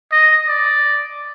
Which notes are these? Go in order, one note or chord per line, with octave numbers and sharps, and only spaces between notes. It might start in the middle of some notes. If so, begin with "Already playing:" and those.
D#5
D5